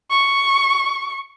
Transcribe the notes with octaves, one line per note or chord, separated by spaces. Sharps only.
C#6